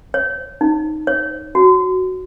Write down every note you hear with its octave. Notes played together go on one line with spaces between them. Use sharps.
C#5
D#4
C#5
F#4